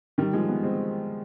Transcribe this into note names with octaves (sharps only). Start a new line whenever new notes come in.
D#3 G3
F3 G#3
G3 B3
G#3 C4